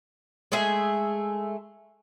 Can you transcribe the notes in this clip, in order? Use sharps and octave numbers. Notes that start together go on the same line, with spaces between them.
G#3 A3 G#4 E5